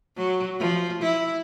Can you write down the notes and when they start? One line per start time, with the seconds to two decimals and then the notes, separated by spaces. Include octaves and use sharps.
0.17 F#3
0.59 F3
1.02 E4